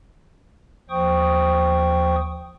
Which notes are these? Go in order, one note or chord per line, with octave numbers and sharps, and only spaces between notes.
D#2 F3 C5 G5 C#6 D#6